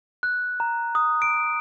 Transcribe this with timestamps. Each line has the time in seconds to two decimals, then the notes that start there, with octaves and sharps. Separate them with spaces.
0.23 F#6
0.60 A#5
0.95 D#6
1.22 D7